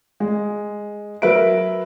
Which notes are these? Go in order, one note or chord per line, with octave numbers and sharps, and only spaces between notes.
G#3
F#3 A#4 B4 E5 D7